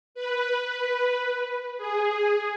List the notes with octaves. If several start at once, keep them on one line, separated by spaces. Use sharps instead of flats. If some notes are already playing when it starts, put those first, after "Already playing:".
B4
G#4